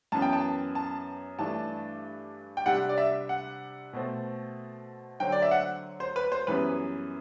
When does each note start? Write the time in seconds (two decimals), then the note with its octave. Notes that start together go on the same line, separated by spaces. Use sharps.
0.12 F#2 E3 B3 A5
0.22 G5
0.33 A5
0.75 A5
1.38 G2 E3 A3 D4 A5
2.57 G5
2.66 C3 G3 D4 F#5
2.89 D5
2.98 E5
3.29 F#5
3.93 B2 A3 C4
5.20 D3 F#3 C4 G5
5.32 D5
5.42 E5
5.51 F#5
6.00 C5
6.16 B4
6.32 C5
6.47 F#2 E3 G3 B3 B4